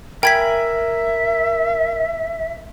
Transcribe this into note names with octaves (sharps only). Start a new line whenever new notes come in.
A#4 E5 G5 G#5 B5 G#6 B6